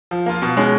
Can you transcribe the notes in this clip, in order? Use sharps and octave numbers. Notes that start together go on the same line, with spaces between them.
F3
A#3 F4
B2
G#3 C#4